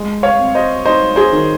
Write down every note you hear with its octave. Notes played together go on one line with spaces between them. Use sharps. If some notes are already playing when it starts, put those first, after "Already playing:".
Already playing: G#3
C#5 F5
C4
C5 D#5
D#4 C5 D#5
G#4 C5
D#3